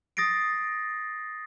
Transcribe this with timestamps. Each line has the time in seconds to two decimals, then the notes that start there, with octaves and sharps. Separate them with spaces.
0.17 D#6 A6 A#6 C7 D7